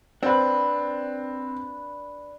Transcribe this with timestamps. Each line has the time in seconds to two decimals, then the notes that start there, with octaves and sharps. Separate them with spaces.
0.23 C4 D4 B4